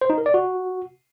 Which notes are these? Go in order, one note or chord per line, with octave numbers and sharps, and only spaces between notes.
C5
D#4
A#4
D5
F#4